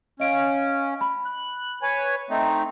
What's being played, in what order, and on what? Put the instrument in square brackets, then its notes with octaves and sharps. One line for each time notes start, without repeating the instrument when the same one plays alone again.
[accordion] C#4 [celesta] D#5 F5 D7
[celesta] B5
[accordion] F#6
B4 C#5 G#5
A3 C4 D#4